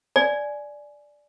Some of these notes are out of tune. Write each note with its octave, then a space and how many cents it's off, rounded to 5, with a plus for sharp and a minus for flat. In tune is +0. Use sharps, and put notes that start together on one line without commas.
D5 +0 G#5 +15